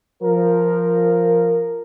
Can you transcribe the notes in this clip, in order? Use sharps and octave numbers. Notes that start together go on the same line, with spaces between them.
F3 A#4